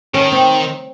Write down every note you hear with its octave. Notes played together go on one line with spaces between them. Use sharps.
D#3 C#4
C4